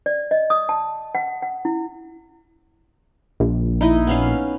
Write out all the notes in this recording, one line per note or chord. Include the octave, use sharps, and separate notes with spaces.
D5
D#5
D#6
A5
F#5
F#5
E4
A#1
D#4 E4 D#5
B3 C#4 F5